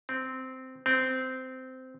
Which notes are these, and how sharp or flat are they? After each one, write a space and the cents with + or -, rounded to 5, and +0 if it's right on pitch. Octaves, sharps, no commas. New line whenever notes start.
C4 -10
C4 -15